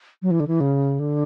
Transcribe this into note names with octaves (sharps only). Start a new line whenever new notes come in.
F#3
E3
D3
E3
C#3
D3